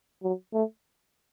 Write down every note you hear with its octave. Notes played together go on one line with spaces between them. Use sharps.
F#3
A3